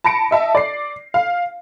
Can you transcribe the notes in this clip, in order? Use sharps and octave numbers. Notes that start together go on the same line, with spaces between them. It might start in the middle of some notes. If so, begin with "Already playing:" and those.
A5 B5 A#6 C#7 D7
D#5 E5 A5
D5 C7
F5